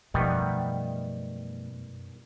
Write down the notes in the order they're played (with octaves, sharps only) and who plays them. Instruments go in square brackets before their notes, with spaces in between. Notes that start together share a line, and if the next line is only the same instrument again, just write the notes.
[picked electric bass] F#2 F3 A3 [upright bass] B2 [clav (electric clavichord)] D#3 G3 B3